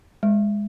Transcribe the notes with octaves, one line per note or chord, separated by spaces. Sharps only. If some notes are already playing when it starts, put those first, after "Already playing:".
G#3